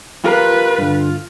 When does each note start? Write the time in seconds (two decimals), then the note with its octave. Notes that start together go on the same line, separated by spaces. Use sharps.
0.24 F4 G4 A#4 B4 F5
0.78 G2 D3